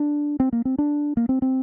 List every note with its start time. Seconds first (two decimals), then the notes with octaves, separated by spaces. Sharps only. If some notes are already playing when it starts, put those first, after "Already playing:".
Already playing: D4
0.40 C4
0.53 A#3
0.65 C4
0.78 D4
1.17 A#3
1.29 C4
1.42 C4